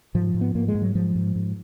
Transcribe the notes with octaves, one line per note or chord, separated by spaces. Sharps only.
G#2 F3
G#2
B3
G#2 A#3
G#3
G#2
F#3
G#2 F3
G#2
G#2